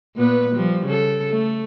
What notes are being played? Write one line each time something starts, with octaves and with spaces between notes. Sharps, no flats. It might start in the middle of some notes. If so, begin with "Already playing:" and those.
A#2 B3 B4
F3 G3
C#3 A4
A3